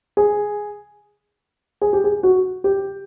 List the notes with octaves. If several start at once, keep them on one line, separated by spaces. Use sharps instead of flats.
G#4
G#4
G4
G#4
F#4
G4